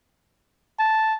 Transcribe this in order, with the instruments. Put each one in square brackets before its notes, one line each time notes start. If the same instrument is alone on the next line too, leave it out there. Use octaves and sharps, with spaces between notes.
[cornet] A5